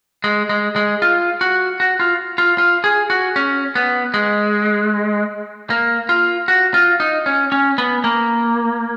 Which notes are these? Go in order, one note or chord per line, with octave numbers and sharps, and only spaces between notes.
G#3
G#3
G#3
F4
F#4
F#4
F4
F4
F4
G#4
F#4
C#4
B3
G#3
A#3
F4
F#4
F4
D#4
C#4
C#4
B3
A#3